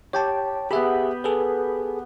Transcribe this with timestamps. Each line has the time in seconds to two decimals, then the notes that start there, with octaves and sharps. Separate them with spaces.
0.13 G4 C#5 G5 A5
0.71 B3 G4 G#4 E5 B5
1.24 G#4 A4 B4